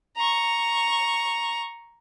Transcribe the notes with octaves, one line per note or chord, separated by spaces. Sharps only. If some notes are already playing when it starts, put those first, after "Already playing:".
A#5 C#6